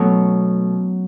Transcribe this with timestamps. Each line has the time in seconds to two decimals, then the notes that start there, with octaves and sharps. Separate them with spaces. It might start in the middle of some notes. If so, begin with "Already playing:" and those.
Already playing: B2 F#3 A3 C#4